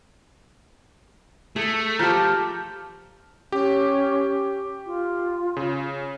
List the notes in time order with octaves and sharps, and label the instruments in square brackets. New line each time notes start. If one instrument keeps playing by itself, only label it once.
[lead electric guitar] A3 [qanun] G#4
[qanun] F3 G4 [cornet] A5 [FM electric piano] A#5 F6 G6
[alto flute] C#4 [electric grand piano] G4
[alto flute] F4
[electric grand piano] C#3